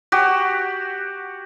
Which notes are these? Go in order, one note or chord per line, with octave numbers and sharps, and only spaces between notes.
F#4 G4